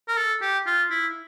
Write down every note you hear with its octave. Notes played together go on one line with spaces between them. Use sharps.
A#4
A4
G4
F4
E4